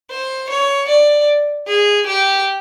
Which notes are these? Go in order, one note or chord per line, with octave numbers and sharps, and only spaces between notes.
C5
C#5
D5
G#4
G4